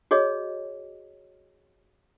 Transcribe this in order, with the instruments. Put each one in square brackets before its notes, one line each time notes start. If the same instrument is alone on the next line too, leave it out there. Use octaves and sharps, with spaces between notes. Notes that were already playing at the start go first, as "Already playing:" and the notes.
[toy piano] F#4 G#4 C#5 D#5